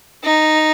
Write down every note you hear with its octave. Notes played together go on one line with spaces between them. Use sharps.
D#4